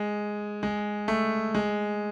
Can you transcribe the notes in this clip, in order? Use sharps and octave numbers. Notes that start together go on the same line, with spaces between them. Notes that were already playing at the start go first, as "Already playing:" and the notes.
Already playing: G#3
G#3
A3
G#3